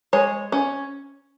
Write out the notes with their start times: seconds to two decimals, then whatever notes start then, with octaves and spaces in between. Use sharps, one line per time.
0.13 G#3 C#5
0.52 C#4